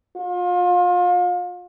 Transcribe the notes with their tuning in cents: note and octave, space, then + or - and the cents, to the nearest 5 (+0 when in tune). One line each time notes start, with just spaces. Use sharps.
F4 +35